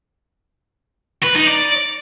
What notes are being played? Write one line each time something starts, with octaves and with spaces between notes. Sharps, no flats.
B4
D#4
D5